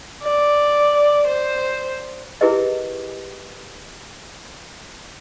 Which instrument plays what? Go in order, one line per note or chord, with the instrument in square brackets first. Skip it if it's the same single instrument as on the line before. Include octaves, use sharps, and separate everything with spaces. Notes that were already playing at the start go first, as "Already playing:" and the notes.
[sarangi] D5
C5
[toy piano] E4 G4 G#4 A#4 B4 D#5